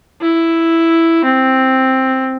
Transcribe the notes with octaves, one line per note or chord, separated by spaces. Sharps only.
E4
C4